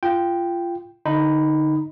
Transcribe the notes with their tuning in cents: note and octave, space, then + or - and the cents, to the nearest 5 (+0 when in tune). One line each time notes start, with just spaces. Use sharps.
F4 -20 G5 +0
D3 +0 D#4 +0 B5 +10